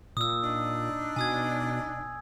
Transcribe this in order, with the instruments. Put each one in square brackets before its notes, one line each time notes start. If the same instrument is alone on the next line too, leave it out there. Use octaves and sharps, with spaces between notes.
[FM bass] A#2 [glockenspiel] D#6 E6
[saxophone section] D4 D#4
[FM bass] B2 [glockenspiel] G#5 D#6 G#6